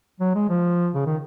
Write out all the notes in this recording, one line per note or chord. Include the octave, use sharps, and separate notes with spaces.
F#3
G#3
F3
C#3
D#3